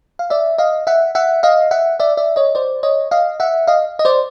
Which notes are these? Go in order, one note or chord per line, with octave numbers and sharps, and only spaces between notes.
F5
D5 E5
D#5 F5
E5 F#5
E5 F#5
D#5 F5
E5 F#5
D5 E5
D5 E5
C#5 D#5
C5 D5
C#5 D#5
D#5 F5
E5 F#5
D#5 F5
D#5
C5 D5